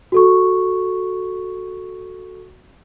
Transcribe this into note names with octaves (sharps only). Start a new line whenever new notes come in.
F#4 A4 C#6